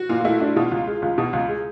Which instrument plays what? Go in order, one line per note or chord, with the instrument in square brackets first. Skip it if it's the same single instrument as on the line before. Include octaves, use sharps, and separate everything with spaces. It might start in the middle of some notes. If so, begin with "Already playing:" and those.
Already playing: [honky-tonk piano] F#4
[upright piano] A#2 [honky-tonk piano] F4
[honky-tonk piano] F4
[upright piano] A3 [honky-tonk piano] E4
[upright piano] D4 [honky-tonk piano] E4
[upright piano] B2 [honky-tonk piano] F4
[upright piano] C#2
G#3
C#2
B2
C#2
G#3